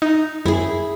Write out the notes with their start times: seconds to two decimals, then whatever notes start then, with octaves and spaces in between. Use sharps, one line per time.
0.02 D#4
0.46 F#2 E4 G#4